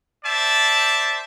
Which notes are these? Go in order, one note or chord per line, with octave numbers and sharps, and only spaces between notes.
C5 D5 E5 A5